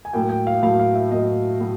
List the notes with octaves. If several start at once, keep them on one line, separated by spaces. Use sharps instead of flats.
G#5
A2 F#3 A#3 G5
G5
F5
A2 F#3 A#3 F5
F5
E5
A2 F#3 A#3 D#5
A2 F#3